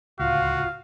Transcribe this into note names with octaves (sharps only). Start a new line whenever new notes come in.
D1 C#2 F4 F#4 F5